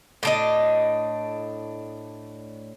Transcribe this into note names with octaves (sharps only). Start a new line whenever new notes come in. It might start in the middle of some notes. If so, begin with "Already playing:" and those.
A2 D4 D#5